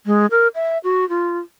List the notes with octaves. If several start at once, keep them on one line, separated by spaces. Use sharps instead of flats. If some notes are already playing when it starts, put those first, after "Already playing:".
G#3
A#4
E5
F#4
F4